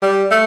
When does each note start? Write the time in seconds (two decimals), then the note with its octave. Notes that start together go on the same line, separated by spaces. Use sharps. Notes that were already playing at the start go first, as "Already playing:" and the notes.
0.02 G3
0.31 A3